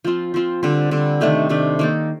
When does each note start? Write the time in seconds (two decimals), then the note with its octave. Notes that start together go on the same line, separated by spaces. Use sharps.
0.04 F3 C4 F4
0.34 F3 C4 F4
0.63 D3 G3 C4
0.91 D3 G3 C4
1.21 C3 D#3 A3 D4
1.49 C3 D#3 A3 D4
1.79 D#3 A#3 D#4 A4